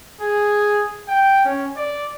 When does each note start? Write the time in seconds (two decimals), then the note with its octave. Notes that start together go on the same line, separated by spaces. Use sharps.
0.21 G#4
1.08 G5
1.45 C#4
1.76 D5